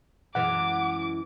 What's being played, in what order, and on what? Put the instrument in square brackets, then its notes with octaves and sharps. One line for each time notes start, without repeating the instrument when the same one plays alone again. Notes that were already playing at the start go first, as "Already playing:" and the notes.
[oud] F#2 E3 G#3 [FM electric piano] F#5 [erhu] D6